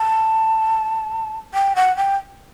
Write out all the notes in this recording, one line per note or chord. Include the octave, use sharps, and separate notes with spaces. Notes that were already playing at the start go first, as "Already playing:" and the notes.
Already playing: A5
G5
F#5
G5